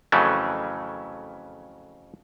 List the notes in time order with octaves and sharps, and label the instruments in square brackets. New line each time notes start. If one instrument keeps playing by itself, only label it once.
[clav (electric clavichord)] F2 C#3 E3 F#3 A3 C#4